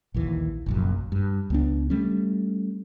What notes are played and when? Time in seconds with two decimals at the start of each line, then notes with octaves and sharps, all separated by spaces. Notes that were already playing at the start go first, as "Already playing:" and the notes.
0.14 A#1 D#2 E3
0.66 F1 A#1 F#2
1.12 G2
1.50 C#2 B3 D4
1.90 G3 A3 C#4